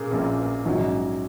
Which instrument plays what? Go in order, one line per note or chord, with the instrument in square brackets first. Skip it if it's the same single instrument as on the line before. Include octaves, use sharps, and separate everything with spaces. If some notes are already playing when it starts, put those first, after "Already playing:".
Already playing: [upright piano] A#2 A#3 C#4 G#4
A#1 A#2 A#3 C#4
A#1 G#2 F#3 C#4